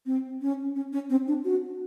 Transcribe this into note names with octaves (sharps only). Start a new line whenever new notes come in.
C4
C#4
C#4
C#4
C4
D4
F#4